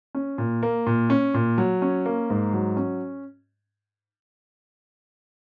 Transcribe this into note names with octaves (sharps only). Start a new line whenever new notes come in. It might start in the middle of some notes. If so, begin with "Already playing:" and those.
C#4
A#2
A#3
A#2
C#4
A#2
F#3
C#4
A#3
G#2
F#3
C#4